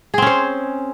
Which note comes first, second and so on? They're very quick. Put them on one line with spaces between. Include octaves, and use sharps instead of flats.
G#4 C4 C#4 C5